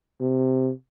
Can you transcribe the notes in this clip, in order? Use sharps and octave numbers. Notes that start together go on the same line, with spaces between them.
C3